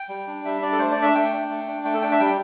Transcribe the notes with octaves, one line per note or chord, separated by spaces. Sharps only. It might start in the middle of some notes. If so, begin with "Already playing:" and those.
Already playing: G5
G3
D4
G3 E5
D4 D5
A4
A3 C5
D5
D4
E5
A3 G5
D4
A3
D4
A3 G5
A4
D4 G5
E5
G3 G5